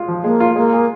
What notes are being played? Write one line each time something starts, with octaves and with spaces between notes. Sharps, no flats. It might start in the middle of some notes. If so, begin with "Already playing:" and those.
Already playing: G#3 F4
F3
G#3 A#3
F4
G#3 A#3
G#4